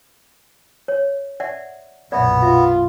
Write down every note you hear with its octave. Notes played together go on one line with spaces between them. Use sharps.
C#5
D5 E5 F#5
B1 F#2 A#2 B3 D5 E5
F4 E5